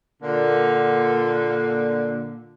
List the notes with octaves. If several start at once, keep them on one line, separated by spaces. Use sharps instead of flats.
A#2 D3 A#3